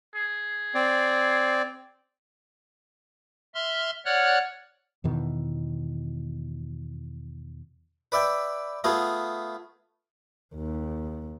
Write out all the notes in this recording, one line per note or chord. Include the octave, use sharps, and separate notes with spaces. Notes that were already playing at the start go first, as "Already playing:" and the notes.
G#4
C4 D5
E5 C6 F6
C#5 D5 F#5 F6 F#6
E2 B2 D#3 E3
B4 D5 E5 G5
A3 B3 F4 G#4
D#2